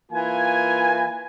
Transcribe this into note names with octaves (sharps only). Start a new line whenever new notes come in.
E3 A#3 F4 G#5